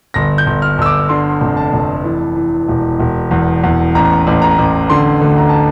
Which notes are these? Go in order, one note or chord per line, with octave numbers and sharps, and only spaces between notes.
G1 A#6
G6
G1
F6
G1 E6
D6
D3 C6
F1
A5
F1
E3
E3
E1
E1
E2
E2
A1 A#5
A1
A#5
A1
D3 C6
D2
A#5
A5